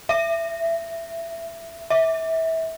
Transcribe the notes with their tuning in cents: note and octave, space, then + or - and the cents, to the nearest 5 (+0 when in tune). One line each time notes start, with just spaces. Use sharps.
E5 +20
E5 -25